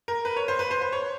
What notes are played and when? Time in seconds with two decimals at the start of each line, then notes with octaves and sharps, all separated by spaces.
0.08 A#4
0.25 B4
0.37 C#5
0.48 C5
0.59 B4
0.71 C5
0.81 C5
0.92 C#5